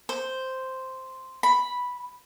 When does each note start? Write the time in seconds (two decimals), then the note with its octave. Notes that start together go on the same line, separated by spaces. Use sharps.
0.09 C5
1.43 B5